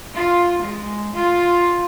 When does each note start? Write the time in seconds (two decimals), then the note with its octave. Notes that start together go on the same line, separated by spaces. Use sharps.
0.15 F4
0.63 G#3
1.15 F4